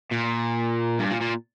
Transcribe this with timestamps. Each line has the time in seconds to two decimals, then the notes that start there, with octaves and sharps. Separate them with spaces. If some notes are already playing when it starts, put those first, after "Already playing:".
0.12 A#2
1.00 G2
1.11 A#2
1.21 A#2